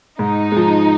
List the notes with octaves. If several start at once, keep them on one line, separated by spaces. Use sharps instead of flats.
G#2 D#4
F3 G#3